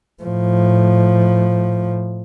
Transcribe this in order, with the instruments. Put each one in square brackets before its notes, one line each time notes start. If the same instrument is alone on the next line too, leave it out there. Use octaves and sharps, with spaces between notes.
[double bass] A2 F3